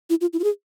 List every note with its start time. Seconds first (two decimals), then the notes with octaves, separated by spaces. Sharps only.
0.10 E4
0.21 F4
0.33 E4
0.39 F4
0.44 G#4